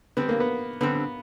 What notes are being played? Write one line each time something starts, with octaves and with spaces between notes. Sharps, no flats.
D3 G3 B3 C4
A#3
B3
D3 G3 B3 C4